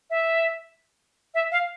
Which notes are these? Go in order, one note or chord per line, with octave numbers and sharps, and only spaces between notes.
E5
E5
F5